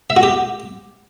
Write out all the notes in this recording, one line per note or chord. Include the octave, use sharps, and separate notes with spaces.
E5
F#4
G4